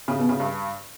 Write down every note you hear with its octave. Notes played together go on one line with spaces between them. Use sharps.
C#3
B2
C#3
G2